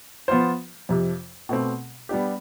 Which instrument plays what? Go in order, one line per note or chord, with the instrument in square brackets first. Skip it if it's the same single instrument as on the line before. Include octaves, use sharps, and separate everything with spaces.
[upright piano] F3 B3 F4 C5
F2 C3 F3
B2 A3 C4
G3 B3 D4 G4